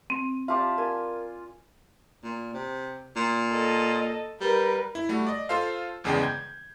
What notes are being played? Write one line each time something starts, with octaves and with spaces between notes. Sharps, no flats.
C4
F4 G4 D5 E5 A5
A#4 G#5
A#2
C3
A#2
A4 D#5
G3 A#4 B4
E4
G3 A3 F#4
D5 D#5
F4 A4 C5 F5
G1 E2 C#3 G#3 D5 G5
G6 G#6